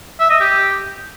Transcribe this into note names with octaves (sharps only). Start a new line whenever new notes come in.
E5
D#5
G4